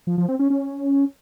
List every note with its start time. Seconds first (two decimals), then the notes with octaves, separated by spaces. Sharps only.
0.07 F3
0.18 F3
0.29 C4
0.39 C#4
0.50 C#4